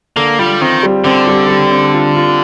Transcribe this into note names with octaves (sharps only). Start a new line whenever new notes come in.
D3 A#3
G3 F4
D#3 C4
G3
D3 C4
G3
G3
C4
F4
F4